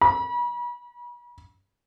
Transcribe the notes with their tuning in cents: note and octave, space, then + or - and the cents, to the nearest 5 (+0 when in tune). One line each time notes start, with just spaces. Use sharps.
B5 -40